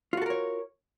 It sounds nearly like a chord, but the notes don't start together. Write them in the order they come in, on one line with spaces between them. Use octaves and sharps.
F4 F#4 A4 A#4 C#5